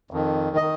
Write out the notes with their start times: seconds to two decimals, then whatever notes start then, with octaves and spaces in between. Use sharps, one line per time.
0.11 F2 D#3
0.56 D#3 D#5